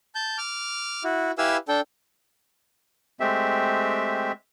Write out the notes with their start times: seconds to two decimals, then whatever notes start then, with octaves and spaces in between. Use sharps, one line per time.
0.15 A5 G6
0.38 D6 F6
1.04 E4 F#4
1.38 E4 G4 B4 F5 G#5 E6
1.68 D4 A4 G5
3.20 G#3 A3 C4 G4 E5